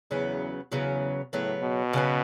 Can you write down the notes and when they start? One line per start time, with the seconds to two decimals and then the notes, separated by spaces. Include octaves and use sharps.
0.11 E2 C#3 F#3 B3
0.72 E2 C#3 F#3 B3
1.32 A2 C#3 F#3 B3
1.63 B2
1.93 C#3 F#3 B3